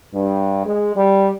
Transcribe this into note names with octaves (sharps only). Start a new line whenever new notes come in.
G2
G#3
G3